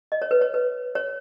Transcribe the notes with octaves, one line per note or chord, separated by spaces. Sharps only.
D#5
C#5
B4
C#5
B4
C#5